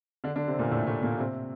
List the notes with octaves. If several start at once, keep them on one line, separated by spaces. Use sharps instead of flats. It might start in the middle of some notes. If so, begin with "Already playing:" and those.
D3 D4
D3 D4
C3 C4
A#2 A#3
A2 A3
A2 A3
A#2 A#3
C3 C4